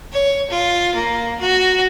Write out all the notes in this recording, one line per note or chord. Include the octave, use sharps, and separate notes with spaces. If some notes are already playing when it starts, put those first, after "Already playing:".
C#5
F4
A#3
F#4